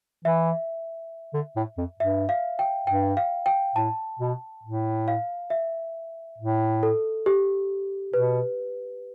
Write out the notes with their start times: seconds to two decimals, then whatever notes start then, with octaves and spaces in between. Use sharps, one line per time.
0.25 E3 E5
1.34 D3
1.56 A2
1.78 F2
1.99 G2 E5
2.29 F5
2.59 G5
2.87 G2 G5
3.17 F5
3.46 G5
3.75 A2 A5
4.19 B2
4.64 A2
5.08 F5
5.50 E5
6.38 A2
6.83 A4
7.26 G4
8.14 B2 B4